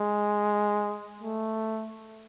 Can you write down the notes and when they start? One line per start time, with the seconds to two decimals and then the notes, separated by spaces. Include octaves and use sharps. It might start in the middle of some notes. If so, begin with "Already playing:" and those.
Already playing: G#3
1.21 A3